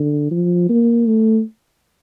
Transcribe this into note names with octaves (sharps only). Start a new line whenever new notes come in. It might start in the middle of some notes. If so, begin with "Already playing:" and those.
Already playing: D3
F3
A#3
A3